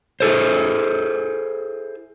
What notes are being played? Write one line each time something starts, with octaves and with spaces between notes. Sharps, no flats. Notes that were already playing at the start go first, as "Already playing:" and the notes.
E4 G#4 A4 C5